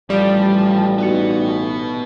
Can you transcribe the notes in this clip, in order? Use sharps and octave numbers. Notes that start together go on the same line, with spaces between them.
A1 F3 G3 G4 D5
B2 B3 D#4 F#4 C#7